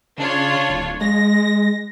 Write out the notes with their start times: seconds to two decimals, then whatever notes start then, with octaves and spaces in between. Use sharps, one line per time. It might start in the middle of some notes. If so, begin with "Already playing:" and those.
0.18 C#3 D4 F4 C#5
0.70 D1
1.01 G#3 A#6